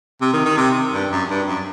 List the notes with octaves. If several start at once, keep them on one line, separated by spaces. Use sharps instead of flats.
C3
D#3
D#3
C3
G2
F#2
G2
F#2